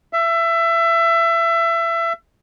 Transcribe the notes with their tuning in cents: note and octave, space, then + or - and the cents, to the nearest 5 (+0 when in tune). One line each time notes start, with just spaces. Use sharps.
E5 +25